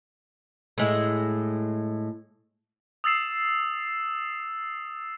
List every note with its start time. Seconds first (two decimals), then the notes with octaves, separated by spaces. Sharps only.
0.78 A2 G#3 E4
3.04 D#6 E6 A6 C7 E7